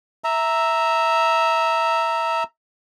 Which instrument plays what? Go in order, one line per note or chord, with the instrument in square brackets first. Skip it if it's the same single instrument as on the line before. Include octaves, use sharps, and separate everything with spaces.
[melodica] E5 A#5